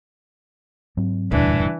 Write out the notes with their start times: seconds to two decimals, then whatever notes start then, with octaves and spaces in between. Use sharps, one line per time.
0.97 G#2 F#3 C4
1.32 E1 D2 G2 A#2 E3 D4